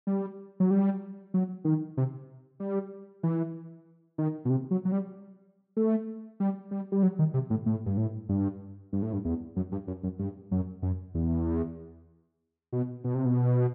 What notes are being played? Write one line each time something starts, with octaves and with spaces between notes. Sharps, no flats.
G3
F#3
G3
F#3
D#3
C3
G3
E3
D#3
B2
C3
F#3
F#3
G3
A3
G3
G3
G3
F#3
D#3
C3
A2
A2
G2
A2
G2
G2
A2
G2
E2
F#2
G2
F#2
F#2
G2
F#2
F#2
E2
B2
B2
C3
B2